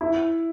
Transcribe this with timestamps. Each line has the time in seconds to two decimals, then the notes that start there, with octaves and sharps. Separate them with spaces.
0.01 E4